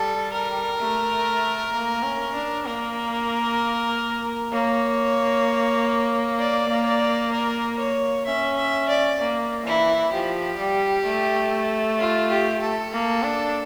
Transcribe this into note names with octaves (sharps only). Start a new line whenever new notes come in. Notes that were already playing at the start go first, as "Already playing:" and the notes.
Already playing: G3 A4
A#4
A3
A#3
C#4
D4
A#3 A#4
A#3 C#5
D5
D5
A#4
C#5
C#4 E5
E5
D5
A#3
E3 E4
F3 G4
G3
A3
F4
G4
A4
A#3
D4